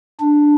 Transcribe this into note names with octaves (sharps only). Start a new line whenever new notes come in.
D4